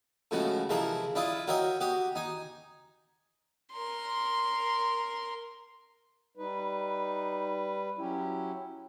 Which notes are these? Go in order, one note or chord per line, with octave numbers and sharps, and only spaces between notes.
A2 C#3 F3 G#3 F#4
C3 E3 F3 G#3 A#4 C6
D4 E4 F4 D#5
F#4 A#4 C#5 D#5 E5 G5
F#4 G4 D#6
D#4 G#5
A#4 C6
G3 D#4 B4
F#3 C#4 E4 G4